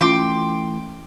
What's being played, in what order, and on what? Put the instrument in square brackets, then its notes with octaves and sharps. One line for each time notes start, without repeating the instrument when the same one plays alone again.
[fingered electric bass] E3 A3 [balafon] C#4 F4 [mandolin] G5 C6 D6